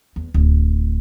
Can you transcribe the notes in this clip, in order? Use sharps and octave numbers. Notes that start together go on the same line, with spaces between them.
E2
D1